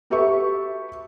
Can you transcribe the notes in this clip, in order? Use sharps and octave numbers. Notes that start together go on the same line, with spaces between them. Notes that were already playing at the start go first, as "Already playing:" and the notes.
F#4 G4 A4 B4 E5 C#6